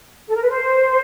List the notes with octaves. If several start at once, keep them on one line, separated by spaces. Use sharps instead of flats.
A4
A#4
B4
C5